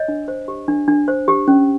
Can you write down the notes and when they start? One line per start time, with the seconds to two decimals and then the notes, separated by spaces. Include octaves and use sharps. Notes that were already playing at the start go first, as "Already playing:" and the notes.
Already playing: C#5 D#5
0.08 D4
0.28 C5
0.48 G4
0.68 D4
0.88 D4
1.08 C5
1.28 G4
1.48 C#4